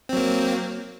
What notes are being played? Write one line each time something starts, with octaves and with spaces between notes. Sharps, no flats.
F#3 A#3 C4